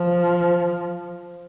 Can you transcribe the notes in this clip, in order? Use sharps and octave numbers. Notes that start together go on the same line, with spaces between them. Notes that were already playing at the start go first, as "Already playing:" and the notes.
Already playing: F3